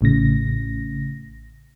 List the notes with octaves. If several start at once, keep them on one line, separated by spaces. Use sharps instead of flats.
A1 A2 C#3 A#6